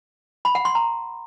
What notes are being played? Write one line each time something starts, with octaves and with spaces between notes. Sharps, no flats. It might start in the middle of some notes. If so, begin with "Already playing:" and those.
B5
F#5
C6
A#5